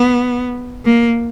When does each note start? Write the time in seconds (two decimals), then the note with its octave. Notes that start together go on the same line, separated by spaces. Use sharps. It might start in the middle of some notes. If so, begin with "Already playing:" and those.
Already playing: B3
0.85 A#3